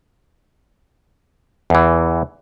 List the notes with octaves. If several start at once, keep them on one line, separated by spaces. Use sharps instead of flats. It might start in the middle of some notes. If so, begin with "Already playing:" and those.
E2 E3